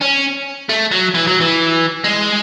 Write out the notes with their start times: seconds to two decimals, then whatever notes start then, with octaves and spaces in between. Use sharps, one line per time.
0.01 C#4
0.69 A3
0.92 F#3
1.14 E3
1.27 F#3
1.40 E3
2.04 G#3